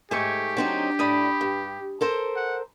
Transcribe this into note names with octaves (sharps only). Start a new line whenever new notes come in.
G#2 A3 G4 G#5 C#6 G#6
F#3 C4 D4 D#4
A2 D4 B5 D#6
G2
A4 A#4 C5
F#5